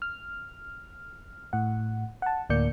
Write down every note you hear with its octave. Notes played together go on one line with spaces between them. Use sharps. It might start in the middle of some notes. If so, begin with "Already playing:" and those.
F6
A2 F#5
F#5 A5
D2 A2 A#3 D5 G6 C#7